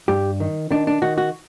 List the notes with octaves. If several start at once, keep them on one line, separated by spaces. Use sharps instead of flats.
G2 G4
D#3
D#3 D4
D4
D#3 F#4
F#4